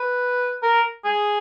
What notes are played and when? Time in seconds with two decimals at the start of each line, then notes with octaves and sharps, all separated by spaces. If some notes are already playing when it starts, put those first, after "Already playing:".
Already playing: B4
0.63 A#4
1.05 G#4